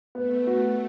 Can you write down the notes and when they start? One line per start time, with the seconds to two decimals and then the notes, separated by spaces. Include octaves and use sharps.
0.15 A3 B3
0.47 F#4